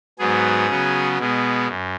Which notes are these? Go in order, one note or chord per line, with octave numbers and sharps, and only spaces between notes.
G#2 F#3 B3 G#4
C#3 F#3 B3
B2 G#3 B3
F#2